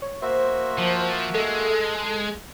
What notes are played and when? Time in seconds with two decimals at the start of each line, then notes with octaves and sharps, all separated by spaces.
0.02 C#5
0.22 A#3 F#4 C5 E5
0.78 F3
1.34 G#3 A4